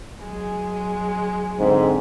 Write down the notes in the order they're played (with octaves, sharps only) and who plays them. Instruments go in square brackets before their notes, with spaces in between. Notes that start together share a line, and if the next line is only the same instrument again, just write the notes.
[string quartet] F#3 G#3
[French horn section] G#2 D3 C4